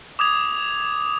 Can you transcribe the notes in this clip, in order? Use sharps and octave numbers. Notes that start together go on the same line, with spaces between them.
D6 D#6 G#6 F7